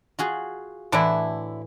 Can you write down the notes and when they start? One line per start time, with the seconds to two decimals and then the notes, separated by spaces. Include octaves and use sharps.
0.19 F4 F#4 G#4
0.92 A2 D3 E3 D4 E4